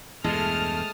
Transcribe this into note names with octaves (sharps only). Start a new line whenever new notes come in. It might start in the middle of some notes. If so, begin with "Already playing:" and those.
E2 G2 B2 G#3 A3 A5 D#6 F6